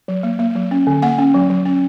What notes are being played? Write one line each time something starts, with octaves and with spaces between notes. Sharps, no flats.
F#3
A#3
A#3
F#3
C#4
D3
A#3 F#5 G#5
C#4
F#3
F#3
C#4